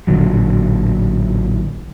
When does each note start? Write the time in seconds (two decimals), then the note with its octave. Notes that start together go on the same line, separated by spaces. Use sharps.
0.07 A1 A#2 D3 F#3